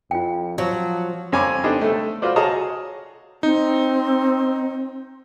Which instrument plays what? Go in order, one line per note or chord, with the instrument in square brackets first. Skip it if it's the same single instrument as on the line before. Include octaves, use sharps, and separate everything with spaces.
[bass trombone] F2 [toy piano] F4 G5
[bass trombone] F3 [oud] F#3
[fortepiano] F2 C#5 G#5 B5 D6
B3 D4 D#4 G4 A4 C5
A3 A4
F4 F#4 B4 C5 D5
F#4 G#4 C#5 D#5 A5 A#5
[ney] C4 [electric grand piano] D#4